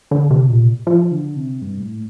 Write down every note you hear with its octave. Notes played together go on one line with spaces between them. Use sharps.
D3
C3
A#2
F3
D3
C3
G2
A2